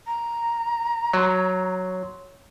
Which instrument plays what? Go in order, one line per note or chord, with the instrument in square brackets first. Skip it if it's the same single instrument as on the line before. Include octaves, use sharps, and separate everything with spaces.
[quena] A#5
[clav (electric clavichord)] F#3 [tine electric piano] C#5 C6